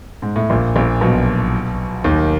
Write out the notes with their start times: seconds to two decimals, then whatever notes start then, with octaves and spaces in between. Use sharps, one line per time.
0.22 G#2
0.36 A2
0.50 A#1 A#2
0.76 A#1 A#2
1.01 B1 B2
2.04 D#2 D#3